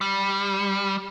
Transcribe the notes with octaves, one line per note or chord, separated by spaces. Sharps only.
G3